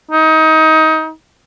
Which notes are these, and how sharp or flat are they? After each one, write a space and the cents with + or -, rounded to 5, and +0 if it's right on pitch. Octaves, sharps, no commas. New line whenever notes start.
D#4 +25